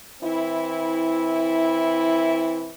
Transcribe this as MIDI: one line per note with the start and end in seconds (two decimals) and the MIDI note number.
0.22 2.74 52
0.22 2.74 60
0.22 2.74 64